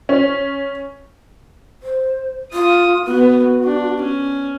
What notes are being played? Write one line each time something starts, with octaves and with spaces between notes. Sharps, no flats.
C#4
C5
F4 D#6
B3 F#4
D4
C#4